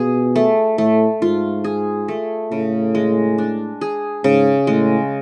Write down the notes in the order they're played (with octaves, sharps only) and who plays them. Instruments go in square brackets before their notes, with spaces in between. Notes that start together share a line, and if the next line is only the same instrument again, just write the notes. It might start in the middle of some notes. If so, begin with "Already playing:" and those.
Already playing: [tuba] B2 [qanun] F4 G#4
[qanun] A3
[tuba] A2 [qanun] A3
[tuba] G#2 [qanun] F4
[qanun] G#4
A3
[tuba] A2 [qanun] C#3
[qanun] G#3
D4
G#4
[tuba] G#2 [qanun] C#3
[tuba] A2 [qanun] G#3